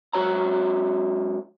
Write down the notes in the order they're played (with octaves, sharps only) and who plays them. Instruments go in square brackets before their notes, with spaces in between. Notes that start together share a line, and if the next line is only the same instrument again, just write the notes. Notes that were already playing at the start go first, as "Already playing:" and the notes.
[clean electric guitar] G#2 F#3 F#4 C#5 A#5